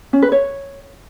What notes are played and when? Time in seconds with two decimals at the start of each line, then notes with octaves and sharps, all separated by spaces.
0.13 C#4
0.22 B4
0.32 C#5